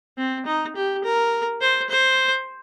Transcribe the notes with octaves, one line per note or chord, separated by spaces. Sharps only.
C4
D#4
G4
A#4
C5
C5